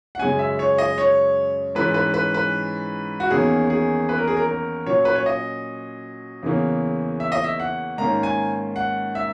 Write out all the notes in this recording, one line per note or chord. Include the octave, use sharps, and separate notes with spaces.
F#5
F#2 C#3 G#3 C#4 G#5
E5
C#5
D#5
C#5
G#2 E3 G#3 C#4 B4
B4
B4
B4
F#4
E2 D#3 A#3 C#4 G#4
G#4
B4
A#4
G#4
A#4
A#4
A#2 F#3 C#4 C#5
B4
C#5
D#5
E2 C#3 E3 A#3 C#4
E5
D#5
E5
F#5
G#2 D#3 A#3 C#4 A#5
G#5
F#5
E5